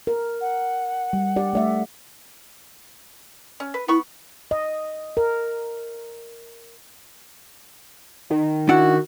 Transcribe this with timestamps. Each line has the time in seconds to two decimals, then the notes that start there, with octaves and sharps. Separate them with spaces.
0.07 A#4
0.41 F#5
1.13 G3
1.36 G4 D5
1.53 A3 D5 E5
3.60 C#4
3.74 B4
3.88 B3 E4 B5 C#6
4.51 D#5
5.17 A#4
8.30 D#3
8.69 D4 E4 F#4 F#5